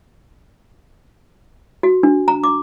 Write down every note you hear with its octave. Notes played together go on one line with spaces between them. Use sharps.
F#4
D4
A#5
D6